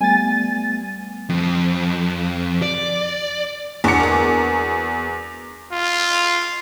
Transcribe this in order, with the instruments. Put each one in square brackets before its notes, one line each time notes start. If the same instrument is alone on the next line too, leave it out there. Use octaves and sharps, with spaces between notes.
[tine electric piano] G3 A3 B3 [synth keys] G#5 A6
[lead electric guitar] F2
D5
[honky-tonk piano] E2 C#7 [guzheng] G#3 D4 F#4
[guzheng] A#3 G#4
[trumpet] F4